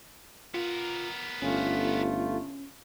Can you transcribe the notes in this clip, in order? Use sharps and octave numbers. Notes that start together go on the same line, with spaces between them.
B3 F4 A#4
G1 A3 C#4 F4